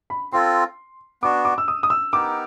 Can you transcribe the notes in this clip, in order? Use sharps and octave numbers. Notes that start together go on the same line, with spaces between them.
B5
C4 F4 A4 C6
B3 D4 F#4 D6
D6
E6
D#6
D#6
E6
B3 D#4 G4 A#4 D6